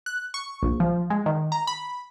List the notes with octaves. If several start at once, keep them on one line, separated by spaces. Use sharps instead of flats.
F#6
C#6
A#1
F3
G#3
D#3
A#5
B5